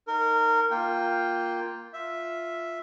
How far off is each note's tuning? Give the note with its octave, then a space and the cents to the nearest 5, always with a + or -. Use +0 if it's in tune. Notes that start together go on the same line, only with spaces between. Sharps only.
D#4 +0 A#4 -20
A#3 +0 F4 +0 G5 +0
F4 +0 E5 +0